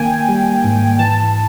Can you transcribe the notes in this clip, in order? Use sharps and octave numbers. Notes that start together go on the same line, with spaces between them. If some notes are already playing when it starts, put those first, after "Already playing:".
Already playing: D#3 A#3 G5 G#5
G3
G#2
E3 A5